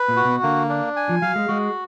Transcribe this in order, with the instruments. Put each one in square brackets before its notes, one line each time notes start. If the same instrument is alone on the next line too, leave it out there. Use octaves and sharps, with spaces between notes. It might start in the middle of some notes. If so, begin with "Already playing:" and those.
Already playing: [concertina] B4
[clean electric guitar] A#2
[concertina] F#4
[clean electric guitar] B2
[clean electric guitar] D3 [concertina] A#3
[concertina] D4
G#5
[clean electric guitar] F3
[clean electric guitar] F#3 [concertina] F5
[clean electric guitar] G#3
[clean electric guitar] G#3 [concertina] F#4